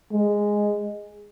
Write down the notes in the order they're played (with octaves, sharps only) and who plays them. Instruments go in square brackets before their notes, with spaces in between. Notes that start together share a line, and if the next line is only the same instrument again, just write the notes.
[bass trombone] G#3